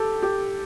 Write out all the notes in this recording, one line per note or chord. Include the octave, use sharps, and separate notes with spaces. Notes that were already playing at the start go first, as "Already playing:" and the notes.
Already playing: G4 A4
G4